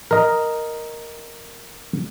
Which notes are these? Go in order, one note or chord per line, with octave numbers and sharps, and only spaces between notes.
A#4 D#5 A#5